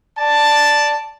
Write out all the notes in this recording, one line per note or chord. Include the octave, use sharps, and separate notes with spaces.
D5 A5